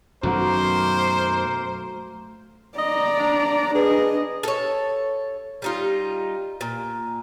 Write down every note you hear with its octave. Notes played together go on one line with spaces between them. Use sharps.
F#2 B2 D#3 F#3 A3 A#3 F#4 C5
D5 D#5 A#5
D4
D4 G#4 B4 D#5
A4 C#5
G3 D#4 F4
A#2